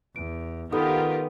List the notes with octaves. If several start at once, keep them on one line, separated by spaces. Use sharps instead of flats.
E2 D7
D#3 B3 D#4 F4 G4 A4 A#4 D#6